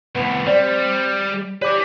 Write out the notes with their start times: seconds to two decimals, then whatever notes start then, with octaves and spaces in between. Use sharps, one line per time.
0.15 C2 A2 B3
0.47 G3 C4 D5
1.62 G3 B4 C#5 G#5 D6